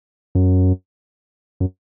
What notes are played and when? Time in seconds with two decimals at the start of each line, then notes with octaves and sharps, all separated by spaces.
0.35 F#2
1.60 F#2